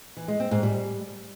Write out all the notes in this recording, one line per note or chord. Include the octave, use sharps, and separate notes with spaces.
E3
G#3
C4
G#2
G3